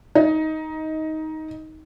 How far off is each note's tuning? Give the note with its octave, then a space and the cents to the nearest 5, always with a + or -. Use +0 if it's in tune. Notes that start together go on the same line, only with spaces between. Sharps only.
D#4 +15